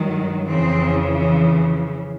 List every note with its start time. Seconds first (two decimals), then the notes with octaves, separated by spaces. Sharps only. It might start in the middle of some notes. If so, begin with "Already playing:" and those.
Already playing: G2 D#3 F#3
0.46 F2 C#3 E3 C4